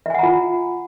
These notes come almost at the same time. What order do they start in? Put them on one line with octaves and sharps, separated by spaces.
E5 G#5 F#5 A#5 F4